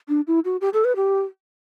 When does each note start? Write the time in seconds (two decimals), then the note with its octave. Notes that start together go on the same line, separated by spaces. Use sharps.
0.09 D4
0.27 E4
0.45 F#4
0.61 G4
0.73 A4
0.85 B4
0.96 G4